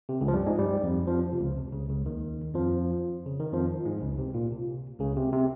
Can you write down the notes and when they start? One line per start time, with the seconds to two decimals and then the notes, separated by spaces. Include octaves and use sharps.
0.09 C3
0.21 C#2 C#3
0.28 F3
0.34 G2 G3
0.46 G#2 G#3
0.58 G2 G3
0.83 F2 F3
1.07 F2 F3
1.33 C3
1.40 C#2 C#3
1.57 C3
1.73 C#2 C#3
1.89 C#2 C#3
2.06 D#2 D#3
2.54 F2 F3
3.26 C#3
3.39 D#3
3.53 F2 F3
3.85 G#2 G#3
4.01 C#2 C#3
4.18 C3
4.34 A#2
4.52 C3
5.00 C#2 C#3
5.17 C3
5.33 C3